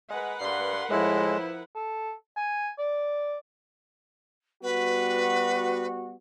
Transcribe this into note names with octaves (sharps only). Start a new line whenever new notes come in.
G#3 A#4 B4 F#5
G2 C6
A2 F3 G#3 E4
A4
G#5
D5
G3 B3 F#4 B4